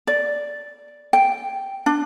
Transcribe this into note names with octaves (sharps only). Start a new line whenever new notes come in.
D5
G5
D4